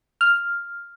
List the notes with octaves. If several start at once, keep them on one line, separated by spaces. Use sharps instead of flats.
F6